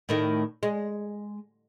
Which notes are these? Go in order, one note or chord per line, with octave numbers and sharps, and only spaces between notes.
A2 D#3 A3
G#3